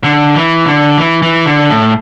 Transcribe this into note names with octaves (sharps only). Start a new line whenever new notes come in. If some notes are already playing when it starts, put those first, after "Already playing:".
D3
E3
D3
E3
E3
D3
A2